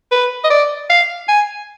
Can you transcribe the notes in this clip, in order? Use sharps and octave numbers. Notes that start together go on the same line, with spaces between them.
B4
D#5
D5
F5
G#5